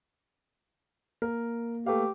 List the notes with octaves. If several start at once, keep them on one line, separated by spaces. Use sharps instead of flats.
A#3 A#4
A3 G4 B4 F5